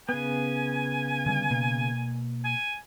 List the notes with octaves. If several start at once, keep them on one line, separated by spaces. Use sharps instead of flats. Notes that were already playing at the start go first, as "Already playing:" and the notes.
C#3 B3 G#5
D3 G3
B2 A#3
G#5